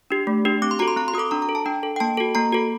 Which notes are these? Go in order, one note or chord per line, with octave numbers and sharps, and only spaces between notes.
D4 G4
A3
D4 G4
C4 D6
C6
F#4 A4 A#5
C6
C4 A#5
C6
F#4 A4 D6 D#6
D4 A#5
A#5
A4
A5
D4 G5
A4
G5
A#3 A5
F#4 A4
A#3 A#5
F#4 A4